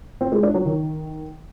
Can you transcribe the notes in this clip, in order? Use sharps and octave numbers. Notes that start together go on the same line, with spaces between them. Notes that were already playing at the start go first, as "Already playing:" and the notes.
C4
G#3
D4
F#3
D#3